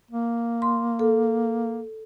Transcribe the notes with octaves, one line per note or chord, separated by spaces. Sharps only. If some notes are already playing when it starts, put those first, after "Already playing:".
A#3
C6
A4